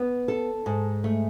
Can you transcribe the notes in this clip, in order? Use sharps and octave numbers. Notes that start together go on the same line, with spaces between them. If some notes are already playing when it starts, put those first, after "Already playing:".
Already playing: B3
A4
G#2
A3